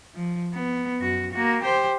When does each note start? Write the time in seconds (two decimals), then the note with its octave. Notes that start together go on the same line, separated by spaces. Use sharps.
0.14 F3
0.54 B3
1.00 F#2 F#4
1.33 A#3 F#4
1.63 G4 C5